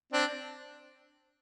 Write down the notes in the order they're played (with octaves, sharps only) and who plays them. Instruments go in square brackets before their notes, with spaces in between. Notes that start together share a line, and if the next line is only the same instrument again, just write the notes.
[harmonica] C4 D4